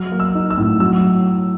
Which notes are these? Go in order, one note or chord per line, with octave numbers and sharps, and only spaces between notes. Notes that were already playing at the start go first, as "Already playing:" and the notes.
Already playing: F#3 F6
A#3
E6
D#4
E6
A2
F#3 E6